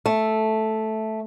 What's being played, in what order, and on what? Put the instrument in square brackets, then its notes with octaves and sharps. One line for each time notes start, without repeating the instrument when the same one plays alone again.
[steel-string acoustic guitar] A3